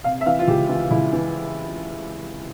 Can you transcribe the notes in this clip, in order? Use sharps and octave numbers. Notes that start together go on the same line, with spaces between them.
C3 F5
E5
E3 F5
F4
C#2 G4
E3 F4
C#2 E4
E3